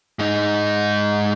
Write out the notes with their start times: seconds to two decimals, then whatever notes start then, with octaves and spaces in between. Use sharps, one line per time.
0.19 G#2 D#4